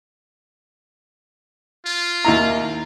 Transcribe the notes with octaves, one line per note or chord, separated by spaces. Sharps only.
F4
D#2 E4 A#5